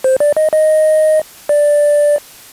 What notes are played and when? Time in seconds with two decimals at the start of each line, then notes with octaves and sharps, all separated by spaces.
0.04 C5
0.20 D5
0.37 D#5
0.53 D#5
1.49 D5